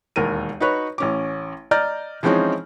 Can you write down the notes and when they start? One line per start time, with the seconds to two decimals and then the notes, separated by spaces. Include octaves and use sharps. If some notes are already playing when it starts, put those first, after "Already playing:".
0.16 E1 D#2 A#4 D#7
0.60 D#4 F#4 B4 C#5
0.98 A1 C#4 D6
1.71 D5 D#5 A#5 F6 G6
2.23 E3 F3 G#3 C4 C#4 D#4